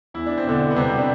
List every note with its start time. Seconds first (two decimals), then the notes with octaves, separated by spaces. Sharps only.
0.14 E2 E4
0.26 D4
0.38 C4
0.45 B2 D3 D4
0.71 B3
0.76 C3 G3 C4
0.99 D4